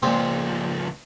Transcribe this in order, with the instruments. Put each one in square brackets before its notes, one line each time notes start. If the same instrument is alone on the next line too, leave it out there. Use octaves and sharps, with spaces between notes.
[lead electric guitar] C#2 F3 [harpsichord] A#2 G#3 C4